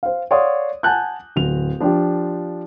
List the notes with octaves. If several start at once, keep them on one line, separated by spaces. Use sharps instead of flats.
C5 F5
C#5 D5 F5 F#5 C6 D#6
F#5 G#5 A5 F#6 G6
D1 F7
F3 D4 F4 G4